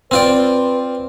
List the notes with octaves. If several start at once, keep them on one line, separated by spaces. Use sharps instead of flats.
C4 F4 B4 D5